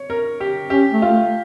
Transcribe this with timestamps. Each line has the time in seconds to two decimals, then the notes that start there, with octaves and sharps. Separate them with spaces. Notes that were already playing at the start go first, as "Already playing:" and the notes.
Already playing: C#5
0.10 A#4
0.40 G4
0.70 C#4 G4
0.92 A3
1.02 F4
1.12 A3